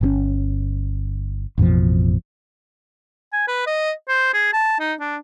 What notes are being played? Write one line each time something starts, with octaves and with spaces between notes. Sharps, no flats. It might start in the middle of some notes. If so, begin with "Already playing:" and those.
G1 C#3 C#4
A1 F2 B2 F3
G#5
B4
D#5
C5
G#4
A5
D#4
D4